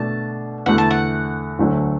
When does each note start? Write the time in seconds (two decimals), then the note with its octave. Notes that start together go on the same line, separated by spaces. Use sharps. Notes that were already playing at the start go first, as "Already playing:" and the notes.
Already playing: B2 A3 D4 A5
0.66 E2 D3 A3 F#4 F#5
0.78 A5
0.91 F#5
1.59 D2 D3 F#3 A3 D4